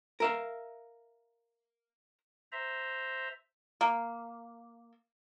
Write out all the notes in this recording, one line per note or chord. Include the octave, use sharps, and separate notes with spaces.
A#4 E5 F5
C5 E5 A#5
A#3